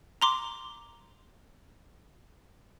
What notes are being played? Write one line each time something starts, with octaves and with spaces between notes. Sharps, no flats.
A#5 C6 D6